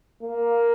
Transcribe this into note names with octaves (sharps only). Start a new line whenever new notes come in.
A#3